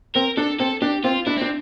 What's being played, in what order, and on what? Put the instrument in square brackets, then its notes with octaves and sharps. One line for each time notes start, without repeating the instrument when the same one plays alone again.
[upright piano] C4 [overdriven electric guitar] A#4
[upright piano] D4 [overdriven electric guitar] A4
[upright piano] C4 [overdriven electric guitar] A4
[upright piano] D4 [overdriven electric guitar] G4
[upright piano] C4 [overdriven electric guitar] F4
[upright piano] D4 [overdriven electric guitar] E4
[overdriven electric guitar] C4 [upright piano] D4